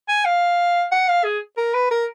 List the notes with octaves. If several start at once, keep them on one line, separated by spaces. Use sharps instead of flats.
G#5
F5
F#5
F5
G#4
A#4
B4
A#4